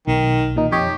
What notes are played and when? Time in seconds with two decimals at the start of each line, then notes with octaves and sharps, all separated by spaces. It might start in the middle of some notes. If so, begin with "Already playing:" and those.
0.07 B1 D#3
0.56 A#2 D#3 D#4
0.72 F2 G4 C#5 D#5